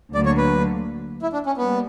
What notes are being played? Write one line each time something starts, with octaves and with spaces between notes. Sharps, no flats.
D2 D3 F#3 A#3 D5
C#5
B4
E4
D4
C#4
G3 A#3 B3